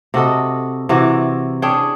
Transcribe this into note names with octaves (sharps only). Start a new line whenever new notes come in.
C3 F#4 A4 D#5
C3 E3 F#4
C#4 D4 G#4 G5